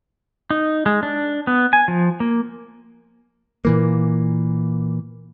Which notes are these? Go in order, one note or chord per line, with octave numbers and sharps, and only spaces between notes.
D#4
G#3
D4
B3
G#5
F3
A#3
A#2 E3 A#3